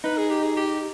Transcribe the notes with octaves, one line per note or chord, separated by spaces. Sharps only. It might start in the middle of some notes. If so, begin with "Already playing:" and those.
D#4 B4
G#4
G4
G#4
G4